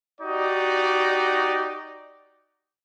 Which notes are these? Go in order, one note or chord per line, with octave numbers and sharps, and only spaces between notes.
D#4 F#4 G4 D5